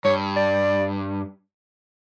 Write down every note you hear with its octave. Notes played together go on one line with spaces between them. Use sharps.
G2 C#5
D5